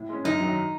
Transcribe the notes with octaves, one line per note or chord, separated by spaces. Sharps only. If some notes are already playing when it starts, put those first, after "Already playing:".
Already playing: A2
G#3 C#4
F#2 D#4
D#3 F#3